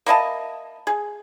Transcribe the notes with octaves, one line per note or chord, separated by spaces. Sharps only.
A#3 E4 D#5 A5
G#4